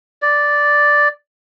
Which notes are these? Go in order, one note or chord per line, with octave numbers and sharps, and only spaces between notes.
D5